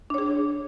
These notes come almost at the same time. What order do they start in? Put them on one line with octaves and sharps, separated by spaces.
D4 C#5 G#4